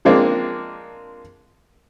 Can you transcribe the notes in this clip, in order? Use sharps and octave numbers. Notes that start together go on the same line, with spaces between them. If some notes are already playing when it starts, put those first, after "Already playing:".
F3 G#3 A#3 C4 D4